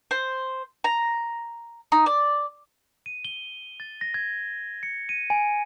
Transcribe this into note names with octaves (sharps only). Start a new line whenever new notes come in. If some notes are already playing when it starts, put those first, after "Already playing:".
C5
A#5
D#4
D5
D#7
G7
A6
A#6
G#6
C#7
D#7
G#5